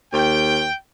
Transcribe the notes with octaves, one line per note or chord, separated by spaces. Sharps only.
D#2 G5